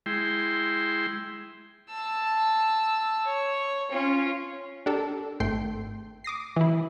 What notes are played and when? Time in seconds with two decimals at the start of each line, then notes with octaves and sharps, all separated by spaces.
0.06 G#3 E4 G5 C6
1.90 A5 E6
3.26 C#5
3.91 C#4 F4
4.86 D4 G4 A4 A#4
5.40 G#1 A3 G5 C6 C7
6.24 D6 D#6 A#6 C7
6.56 E3 E4